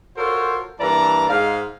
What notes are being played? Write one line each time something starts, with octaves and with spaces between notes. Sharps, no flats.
F4 F#4 A4 A#4 C5 C#5
G2 E3 A#3 D5 A5 A#5
G#2 F5